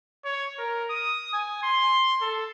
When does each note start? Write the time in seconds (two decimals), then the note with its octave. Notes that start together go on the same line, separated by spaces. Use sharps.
0.25 C#5
0.58 A#4
0.90 D#6
1.34 G#5
1.63 C6
2.21 A4